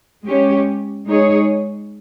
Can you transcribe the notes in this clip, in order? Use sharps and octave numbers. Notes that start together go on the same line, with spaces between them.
G#3 C#4 G4 C#5
G#3 D#4 G#4 C#5